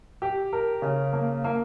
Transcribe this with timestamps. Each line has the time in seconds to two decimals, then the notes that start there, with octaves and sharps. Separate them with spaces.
0.22 G4
0.53 A#4
0.82 C#3
1.13 A#3
1.44 A#3